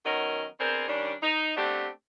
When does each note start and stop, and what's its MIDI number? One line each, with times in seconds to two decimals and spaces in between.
0.05 0.45 51
0.05 0.45 54
0.05 0.45 59
0.05 0.45 61
0.05 0.45 70
0.05 0.45 75
0.60 0.88 59
0.60 0.88 60
0.60 0.88 62
0.60 0.88 68
0.60 0.88 70
0.60 0.88 72
0.88 1.14 51
0.88 1.14 55
0.88 1.14 61
0.88 1.14 62
1.22 1.53 63
1.57 1.88 57
1.57 1.88 59
1.57 1.88 60
1.57 1.88 62
1.57 1.88 67